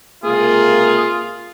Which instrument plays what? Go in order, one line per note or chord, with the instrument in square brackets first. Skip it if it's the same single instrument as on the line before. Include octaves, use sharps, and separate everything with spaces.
[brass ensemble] C#2 C3 A#3 [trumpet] F4 [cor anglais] G#4